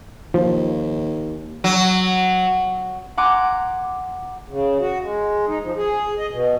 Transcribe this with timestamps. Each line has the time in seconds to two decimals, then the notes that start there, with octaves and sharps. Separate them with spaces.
0.34 D#2 F3
1.64 F#3
3.17 F#5 G#5 A#5 C6 D6 F#6
4.49 C#3
4.80 F#4
5.02 G#3
5.47 D#4
5.62 F3
5.77 G#4
6.19 D#5
6.31 B2